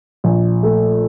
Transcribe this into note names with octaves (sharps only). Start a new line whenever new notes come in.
A#1
A3